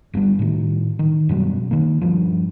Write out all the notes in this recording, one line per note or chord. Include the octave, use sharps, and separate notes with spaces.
G1 G2 C3 G3
A2 D#3
D#3
F#2 B2 F#3 G3
D#3 A#3
G2 F3